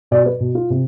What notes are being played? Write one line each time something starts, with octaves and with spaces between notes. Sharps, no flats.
B2 D5
B4
B2
F4
C3